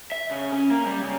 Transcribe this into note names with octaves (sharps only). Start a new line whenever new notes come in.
E5
C#3
C#4
A#3
G3
C#3